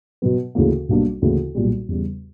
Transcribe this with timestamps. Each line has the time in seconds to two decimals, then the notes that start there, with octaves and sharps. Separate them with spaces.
0.22 B2 F#3 B3
0.55 D2 C#3 E3 A#3
0.89 B1 B2 G3 A#3 D4
1.22 D2 C#3 E3 A#3 E4
1.55 B1 A#2 G3
1.88 E2 C#3 G3